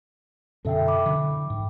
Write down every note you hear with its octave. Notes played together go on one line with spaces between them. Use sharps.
F#2 B2 D3 A4 E5 G5
G5 B5 D6
D3 E3 F#3
G#2